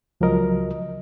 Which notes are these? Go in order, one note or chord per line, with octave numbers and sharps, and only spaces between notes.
C#2 F3 F#3 A#4 D#5